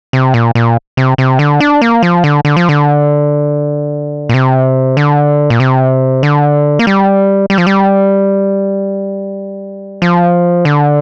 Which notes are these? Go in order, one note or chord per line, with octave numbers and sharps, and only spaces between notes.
C3
A#2
A#2
C3
C3
D3
D4
A#3
F3
D3
D3
F3
D3
A#2
C3
D3
A#2
C3
D3
A#3
G3
G3
F3
G3
F3
D3